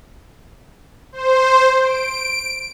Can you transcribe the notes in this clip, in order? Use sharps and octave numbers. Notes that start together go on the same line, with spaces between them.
C5
D7